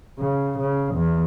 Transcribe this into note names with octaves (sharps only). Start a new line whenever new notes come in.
C#3
C#3
E2